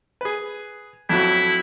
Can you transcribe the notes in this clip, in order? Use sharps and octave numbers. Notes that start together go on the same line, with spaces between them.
G#4 B4
F2 A2 F#3 E4